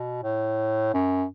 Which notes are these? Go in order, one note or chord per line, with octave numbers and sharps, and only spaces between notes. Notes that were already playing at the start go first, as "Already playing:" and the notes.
Already playing: B2
A2
F#2